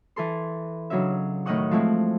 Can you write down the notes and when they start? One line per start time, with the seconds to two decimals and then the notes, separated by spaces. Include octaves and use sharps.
0.16 E3 A4 C6
0.90 C#3 F#3 D4 D#4 E5
1.46 A2 D#3 D#4 D#5 F#5 C#6
1.71 F3 G#3 A3 C4 E4